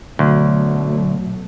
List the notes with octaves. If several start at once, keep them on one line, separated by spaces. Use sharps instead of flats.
D2 B2 F#3 A3